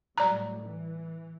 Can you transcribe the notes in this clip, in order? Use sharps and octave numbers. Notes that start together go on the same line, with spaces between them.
A2 F#3 G3 D5 A#5
E3